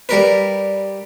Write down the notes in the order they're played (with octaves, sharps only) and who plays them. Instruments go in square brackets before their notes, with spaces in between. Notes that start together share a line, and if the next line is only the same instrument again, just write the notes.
[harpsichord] G3 A#4 B4